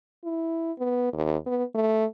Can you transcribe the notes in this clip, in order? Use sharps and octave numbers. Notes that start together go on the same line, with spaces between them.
E4
B3
D#2
B3
A3